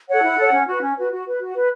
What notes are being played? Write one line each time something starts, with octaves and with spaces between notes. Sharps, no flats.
A4 C#5 F#5
E4
A4 C#5
C#4
F#4 B4
C#4
F#4 B4
F#4
B4
F#4
B4